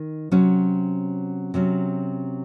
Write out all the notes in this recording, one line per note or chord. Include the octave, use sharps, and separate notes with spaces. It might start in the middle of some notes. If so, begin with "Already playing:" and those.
Already playing: D#3 D#4
C3 F#3 C#4
C3 F#3 C#4